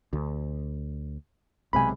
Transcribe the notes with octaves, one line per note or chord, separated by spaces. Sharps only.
D2
B1 C3 G#3 G#5 B5